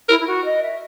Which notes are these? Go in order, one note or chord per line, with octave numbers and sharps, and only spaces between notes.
E4 A#4
E4
F#4
D#5
E5